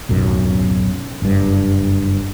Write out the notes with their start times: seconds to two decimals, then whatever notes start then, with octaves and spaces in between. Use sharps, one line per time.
0.09 D1 B1 F#2
1.22 F#1 G2